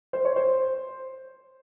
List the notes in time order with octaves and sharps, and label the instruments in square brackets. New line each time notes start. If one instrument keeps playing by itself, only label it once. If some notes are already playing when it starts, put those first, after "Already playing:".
[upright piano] C5
C#5
C5